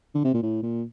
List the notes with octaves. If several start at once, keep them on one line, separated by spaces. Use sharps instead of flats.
D3
C3
A#2
A2
A#2